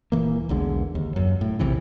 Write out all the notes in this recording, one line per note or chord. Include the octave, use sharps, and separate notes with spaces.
D#1 E2 E3 A#3
B1 E2 D3 G#3
D#2
F#2
A2
A#1 D#2 C3 E3